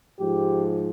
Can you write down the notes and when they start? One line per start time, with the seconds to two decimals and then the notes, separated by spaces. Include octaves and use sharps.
0.20 G#2 F3 G4